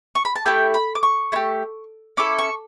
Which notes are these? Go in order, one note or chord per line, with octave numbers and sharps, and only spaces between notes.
C#6
B5
A5
A3 E4 G4 G5
B5
D6
C#6
A3 E4 G4
C#4 E4 A4 D6
C#6